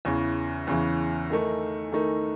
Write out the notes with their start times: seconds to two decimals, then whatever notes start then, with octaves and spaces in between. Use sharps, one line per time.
0.05 E2 C#3 E3
0.67 E2 C#3 E3
1.30 D#3 A3 D#4
1.92 D#3 A3 D#4